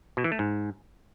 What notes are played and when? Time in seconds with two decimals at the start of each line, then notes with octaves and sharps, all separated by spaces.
0.17 B2
0.24 E3
0.32 A3
0.39 G#2